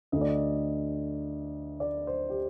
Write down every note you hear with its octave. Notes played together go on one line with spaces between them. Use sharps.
D2 D3 A3 D#5
D5
D#5
D5
C5
G4